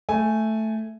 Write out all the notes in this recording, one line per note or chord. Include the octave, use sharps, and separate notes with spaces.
A3 G#5